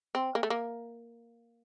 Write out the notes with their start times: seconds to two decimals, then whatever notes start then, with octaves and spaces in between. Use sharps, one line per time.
0.15 C4
0.35 A#3
0.43 A3
0.50 A#3